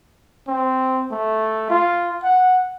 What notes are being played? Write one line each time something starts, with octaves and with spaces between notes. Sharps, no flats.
C4
A3
F4
F#5